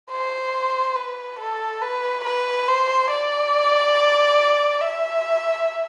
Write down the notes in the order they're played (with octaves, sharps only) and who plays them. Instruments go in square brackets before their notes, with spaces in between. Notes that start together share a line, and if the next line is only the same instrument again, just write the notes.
[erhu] C5
B4
A4
B4
B4
C5
D5
E5